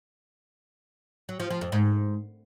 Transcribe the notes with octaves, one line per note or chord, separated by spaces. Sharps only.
F#3
F3
F3
F2
G#2